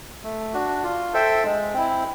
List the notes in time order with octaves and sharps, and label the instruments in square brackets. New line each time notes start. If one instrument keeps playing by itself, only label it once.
[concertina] A3
D4 F#4
F4
A4 C5 E5 G5
G#3
C4 E4